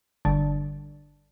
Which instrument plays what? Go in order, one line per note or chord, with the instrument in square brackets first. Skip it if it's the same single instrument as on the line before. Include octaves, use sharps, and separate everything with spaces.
[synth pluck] G1 D3